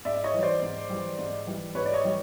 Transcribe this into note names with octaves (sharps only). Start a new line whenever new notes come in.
G#2 D5 E5
C#5 D#5
E3 G3
C5 D5
G#2
E3 G3
G#2
E3 G3
G#2 B4 C#5
D5
C#5 D#5
E3 G3